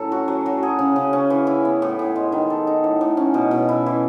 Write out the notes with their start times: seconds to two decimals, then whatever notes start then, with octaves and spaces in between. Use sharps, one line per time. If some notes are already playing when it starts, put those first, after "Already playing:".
Already playing: A2 F#3 C#4 A4
0.12 F#4
0.28 F#3
0.46 F#3
0.63 G#4
0.79 C#3
0.96 C#3
1.13 C#4
1.30 E3
1.47 E4
1.65 B3
1.82 A2
1.99 A2
2.16 G#3
2.32 D#3
2.50 A4
2.67 D#4
2.84 A2
3.01 A2
3.17 C#4
3.34 B2
3.51 B2
3.69 E4
3.86 E3